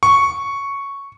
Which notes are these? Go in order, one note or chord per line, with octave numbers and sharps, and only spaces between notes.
C#6